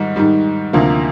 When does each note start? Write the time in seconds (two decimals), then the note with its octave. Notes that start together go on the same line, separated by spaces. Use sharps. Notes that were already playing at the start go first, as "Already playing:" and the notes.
Already playing: G#2 D#3 G3
0.16 G#2 D#3 G3
0.73 D2 C3 F3 A#3